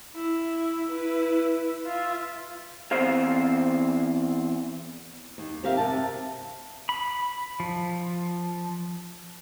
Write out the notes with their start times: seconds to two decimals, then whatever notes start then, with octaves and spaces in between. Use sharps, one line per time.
0.14 E4
0.88 E4 B4
1.86 F4 E5
2.92 E2 C4 C5 F5
5.38 D#2
5.63 C4 G4 A#4 E5 F5
5.77 C3 A5
6.89 B5
7.60 F3